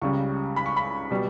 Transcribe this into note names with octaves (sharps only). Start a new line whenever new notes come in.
C#2 C#3 G3 C#6
B5
C#6
B5
B2 G3